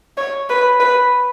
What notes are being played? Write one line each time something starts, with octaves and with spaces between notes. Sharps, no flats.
C#5
B4
B4